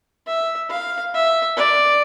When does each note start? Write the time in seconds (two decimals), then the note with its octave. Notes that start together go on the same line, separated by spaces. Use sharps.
0.27 E5
0.70 F5
1.14 E5
1.57 D5